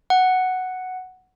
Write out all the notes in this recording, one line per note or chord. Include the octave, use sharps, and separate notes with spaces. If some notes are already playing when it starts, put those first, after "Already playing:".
F#5